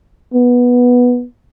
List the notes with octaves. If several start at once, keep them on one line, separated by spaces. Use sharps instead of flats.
B3